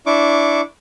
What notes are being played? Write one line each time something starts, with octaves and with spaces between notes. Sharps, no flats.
D4 E4 C#6 D6